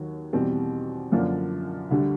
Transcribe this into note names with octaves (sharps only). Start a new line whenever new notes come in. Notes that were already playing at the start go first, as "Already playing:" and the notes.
Already playing: D#2 D#3 F#3
E2 B2 G3 C4
F#2 D3 F3 A#3 D4
D2 D3 G3